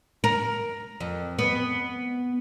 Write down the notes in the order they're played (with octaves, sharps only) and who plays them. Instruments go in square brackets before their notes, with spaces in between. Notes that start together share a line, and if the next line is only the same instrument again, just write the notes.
[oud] A#4
F2
B3